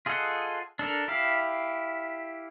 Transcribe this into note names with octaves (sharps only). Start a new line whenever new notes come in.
F4 G#4 A4 D#5 F#5
D4 A4 A#4
E4 G4 F5